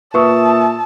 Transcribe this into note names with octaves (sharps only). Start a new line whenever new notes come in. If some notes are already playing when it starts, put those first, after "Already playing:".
A#2 B4 E5 A5 C#6 D#6 E6